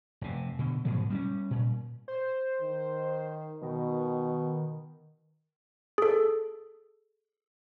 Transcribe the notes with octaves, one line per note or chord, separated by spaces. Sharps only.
F1 C3
B2 D3
G#2 B2 F3 F#3
G3 B3 C#4
A#2
C5
D#3
B2 D#3
G#4 A4